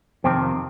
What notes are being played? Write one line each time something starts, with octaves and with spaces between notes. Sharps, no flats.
F2 C3 D#3 C4